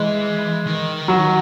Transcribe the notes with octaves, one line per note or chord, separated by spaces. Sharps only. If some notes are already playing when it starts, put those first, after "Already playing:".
Already playing: E3 G#3
D#3
F#3